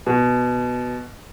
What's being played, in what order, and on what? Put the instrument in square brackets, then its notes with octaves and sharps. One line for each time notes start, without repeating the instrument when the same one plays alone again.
[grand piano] B2